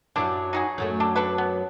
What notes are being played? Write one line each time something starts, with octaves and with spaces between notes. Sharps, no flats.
F#2 F#3 D4 E4
D#4 F#4 G#4
F#2 F#3 A3
D4 A4
D4 A4 B4
B3